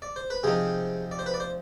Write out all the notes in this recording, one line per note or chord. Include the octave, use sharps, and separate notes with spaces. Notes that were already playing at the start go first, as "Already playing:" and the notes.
D5
C5
B4
C3 F3 C4 D#4 G#4
D5
C5
B4
D5
C5